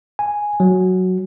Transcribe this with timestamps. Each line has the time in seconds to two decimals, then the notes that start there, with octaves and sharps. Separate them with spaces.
0.19 G#5
0.60 F#3